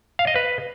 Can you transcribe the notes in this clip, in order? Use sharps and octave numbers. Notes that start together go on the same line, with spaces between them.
F5
D#5
B4